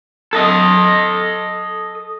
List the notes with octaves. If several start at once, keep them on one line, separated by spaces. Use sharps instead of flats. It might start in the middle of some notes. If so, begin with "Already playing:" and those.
A4 D#5